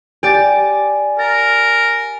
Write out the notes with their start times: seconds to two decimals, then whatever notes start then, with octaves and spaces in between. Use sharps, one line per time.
0.23 G4 D5 G#5 A6
1.19 A#4 A6